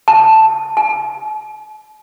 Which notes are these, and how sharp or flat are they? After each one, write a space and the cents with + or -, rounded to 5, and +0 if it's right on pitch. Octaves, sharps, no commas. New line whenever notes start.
A5 +5
A5 -45